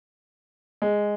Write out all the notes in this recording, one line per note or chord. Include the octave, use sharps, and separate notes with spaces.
G#3